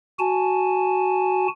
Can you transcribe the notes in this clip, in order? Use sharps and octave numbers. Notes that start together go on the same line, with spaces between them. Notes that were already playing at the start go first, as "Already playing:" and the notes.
F#4 G#5 A5